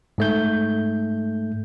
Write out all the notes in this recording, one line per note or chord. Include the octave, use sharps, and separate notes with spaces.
G#2 A3 G6